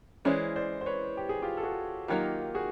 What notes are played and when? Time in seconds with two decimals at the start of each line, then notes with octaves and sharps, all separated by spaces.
0.25 E3 G#3 C#4 E4 C5 D5
0.56 C5 D5
0.81 C5
0.86 B4 C#5
1.17 G4
1.29 G#4
1.42 F4 G4
1.57 A4
1.63 F#4 G#4
2.08 D#3 F#3 A#3 D#4 F4 G4
2.55 F#4 G#4